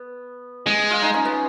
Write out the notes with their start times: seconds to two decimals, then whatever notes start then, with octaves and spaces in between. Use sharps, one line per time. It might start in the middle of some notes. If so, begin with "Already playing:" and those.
Already playing: B3
0.67 G#3
0.91 F4
1.02 D#4
1.14 C#4
1.25 B3